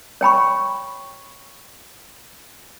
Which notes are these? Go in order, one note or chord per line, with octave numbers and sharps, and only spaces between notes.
C#5 G5 B5 C#6